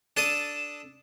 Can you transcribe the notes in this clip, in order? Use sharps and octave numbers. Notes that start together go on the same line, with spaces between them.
D4 A4 A5 D#6